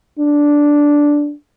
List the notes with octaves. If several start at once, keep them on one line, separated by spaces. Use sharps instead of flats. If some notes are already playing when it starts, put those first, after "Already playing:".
D4